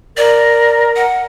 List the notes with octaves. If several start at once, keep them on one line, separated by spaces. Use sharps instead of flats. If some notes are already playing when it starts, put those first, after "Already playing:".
A#4 D5
F#5